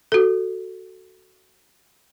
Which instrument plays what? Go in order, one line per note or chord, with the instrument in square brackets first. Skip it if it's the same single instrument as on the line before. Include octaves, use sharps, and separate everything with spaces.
[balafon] F#4 A4